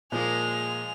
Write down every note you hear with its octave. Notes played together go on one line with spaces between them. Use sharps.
A#2 F3 G#3 A#3 G#4 F7